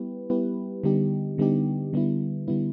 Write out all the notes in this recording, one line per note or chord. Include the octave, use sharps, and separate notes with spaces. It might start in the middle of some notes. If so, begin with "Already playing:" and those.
Already playing: G3 B3 E4 G4 B4
G3 B3 E4 G4 B4
D3 G3 B3 D#4 G4
D3 G3 B3 D#4 G4
D3 G3 B3 E4
D3 G3 B3 E4